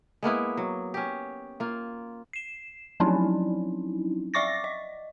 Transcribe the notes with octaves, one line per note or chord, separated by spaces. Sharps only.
G#3 A#3 B3 E4
F#3
C#4 G4
A#3 F4
C7 E7
F3 F#3 C4 C#4 D#4 E4
D5 E5 C#6 D6 A6 A#6
D#5